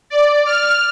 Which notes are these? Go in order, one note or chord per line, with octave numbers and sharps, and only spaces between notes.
D5
F6